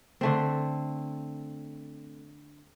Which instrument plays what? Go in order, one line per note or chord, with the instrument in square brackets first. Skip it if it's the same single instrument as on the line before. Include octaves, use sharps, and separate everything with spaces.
[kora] D3 A3 C4